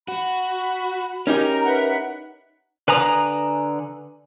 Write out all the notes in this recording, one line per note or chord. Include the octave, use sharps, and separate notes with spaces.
F#4 B5
C#4 D#4 G4 A#4
A#5
B4 E5 F#5
D3 B4 G#5 A#5 D#6